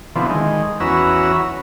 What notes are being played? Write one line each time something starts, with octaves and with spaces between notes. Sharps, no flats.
B2 D3 E3 F3 C4
D#3 G#3
E2 C#4 F#4 B4 A#5 E6